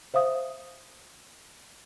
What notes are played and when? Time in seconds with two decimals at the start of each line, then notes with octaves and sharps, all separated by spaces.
0.14 C5 E5 F5 D#6